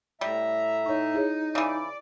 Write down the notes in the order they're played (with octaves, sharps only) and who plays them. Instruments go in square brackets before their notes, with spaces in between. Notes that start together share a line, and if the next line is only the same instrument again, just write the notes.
[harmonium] A2 E5 A#5 [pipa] G3
[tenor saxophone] D#4 [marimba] C#5 C#6
[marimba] E4 G#4 C#5
[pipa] C#3 E3 [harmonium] D5